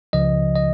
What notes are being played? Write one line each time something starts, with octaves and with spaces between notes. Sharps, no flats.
C#2 C#3 F3 D#5
D#5